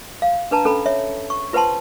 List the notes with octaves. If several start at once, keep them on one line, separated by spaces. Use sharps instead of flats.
F5
D4 B4 A5 A#5
C#4 A4 G5 B5
C#5 E5
C#6
F4 B4 C5 F#5 A5 C6